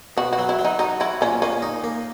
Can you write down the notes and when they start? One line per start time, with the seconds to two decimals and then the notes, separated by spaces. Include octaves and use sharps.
0.17 B2 F#4
0.33 F#4
0.38 F#3
0.49 E4
0.59 F#3
0.65 D#4
0.79 D#4 F#4
1.00 E4 F#4
1.21 A#2 C#4
1.42 A#3 C#4
1.62 D#4
1.84 A#3